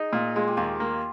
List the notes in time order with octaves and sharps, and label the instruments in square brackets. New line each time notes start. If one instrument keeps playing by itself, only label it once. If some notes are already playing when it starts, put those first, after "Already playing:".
Already playing: [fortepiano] D#4 [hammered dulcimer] G#4
[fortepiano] A#2 [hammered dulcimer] F4
[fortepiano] G#3 [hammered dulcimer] F4
[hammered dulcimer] G4
[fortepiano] D#2 [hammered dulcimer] F4
[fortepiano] A#3